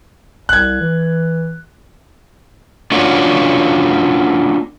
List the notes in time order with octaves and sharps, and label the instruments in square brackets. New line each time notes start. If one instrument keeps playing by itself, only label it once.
[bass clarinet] C2 [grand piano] F#6 G#6
[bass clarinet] E3
[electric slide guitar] A#3 C#4 D4 F4 F#4